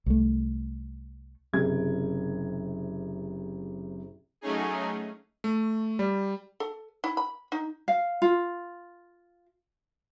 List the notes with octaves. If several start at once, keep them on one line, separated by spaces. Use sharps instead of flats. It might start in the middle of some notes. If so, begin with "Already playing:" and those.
C2 A3
F#1 C3 G#6
F#3 A3 C#4 D#4 G#4
A3
G3
A4
E4
B5
D#4
F5
F4